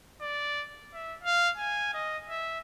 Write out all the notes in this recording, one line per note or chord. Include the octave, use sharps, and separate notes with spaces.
D5
E5
F5
G#5
D#5
E5